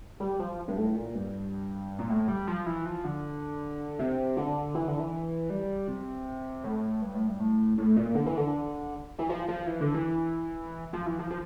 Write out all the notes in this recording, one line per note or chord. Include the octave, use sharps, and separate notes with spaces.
G3
F3
G2
A2
A#2
G2
A#2
A2
G3
F3
E3
F3
D3
C3
D3
E3
D3
E3
G3
C3
A2
G2
A2
G2
A2
A2
A#2
D3
E3
D3
E3
F3
F3
E3
D3
E3
F3
E3
F3
F3